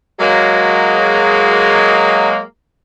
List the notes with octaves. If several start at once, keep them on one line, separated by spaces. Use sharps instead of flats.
F#3 G#3 A#3